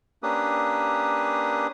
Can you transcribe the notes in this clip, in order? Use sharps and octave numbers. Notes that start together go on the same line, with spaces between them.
A#3 C#4 D4 G4 B4 D#6